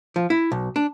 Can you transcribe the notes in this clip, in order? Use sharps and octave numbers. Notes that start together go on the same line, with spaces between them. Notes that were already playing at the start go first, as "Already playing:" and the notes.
F3
E4
B1
D4